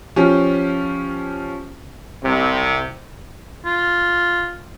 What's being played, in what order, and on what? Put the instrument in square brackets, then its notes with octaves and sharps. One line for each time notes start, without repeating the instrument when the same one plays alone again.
[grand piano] F3 C#4 G4
[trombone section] C2 C3
[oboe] F4